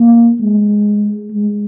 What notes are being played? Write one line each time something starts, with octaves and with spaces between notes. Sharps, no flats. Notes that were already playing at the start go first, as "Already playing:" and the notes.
Already playing: A#3
G#3
G#3